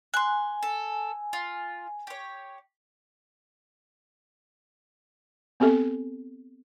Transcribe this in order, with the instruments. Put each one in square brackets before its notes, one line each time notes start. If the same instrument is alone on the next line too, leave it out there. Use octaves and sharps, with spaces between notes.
[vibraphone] G#5 [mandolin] C6 F#6
[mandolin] A4
F4
G4 C#5
[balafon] B3 C4 G4 A4